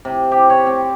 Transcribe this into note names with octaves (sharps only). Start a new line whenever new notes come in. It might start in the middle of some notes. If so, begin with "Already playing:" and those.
C3
G4
C#5
C4